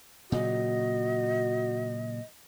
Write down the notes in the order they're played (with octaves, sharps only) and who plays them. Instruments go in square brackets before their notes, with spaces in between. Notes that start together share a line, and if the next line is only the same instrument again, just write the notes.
[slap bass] A#2 C#3 F#3 [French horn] F#4 [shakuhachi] D#5